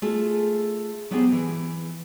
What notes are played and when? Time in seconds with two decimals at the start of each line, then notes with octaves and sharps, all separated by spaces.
0.02 A3 F4 G#4 A4
1.11 F#3 B3 C4 G4 G#4
1.32 E3